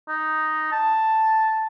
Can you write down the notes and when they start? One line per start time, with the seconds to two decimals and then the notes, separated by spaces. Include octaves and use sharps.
0.09 D#4
0.72 A5